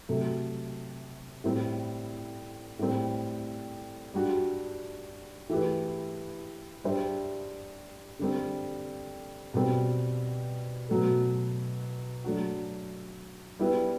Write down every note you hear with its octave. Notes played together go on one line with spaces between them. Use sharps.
C3 F#3 A3
A2 G3 C4 E4
A2 G3 C4
G3 D4 F#4
E3 A3 E4 G4 B4
G3 D4 G4 C5 E5
D3 G3 C4
B2 G3 C4
B2 F#3 A3
F#3 A3 D4 F#4
G3 B3 E4 B4